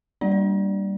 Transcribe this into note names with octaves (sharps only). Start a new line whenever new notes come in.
G3 A#3 D4 D5
D5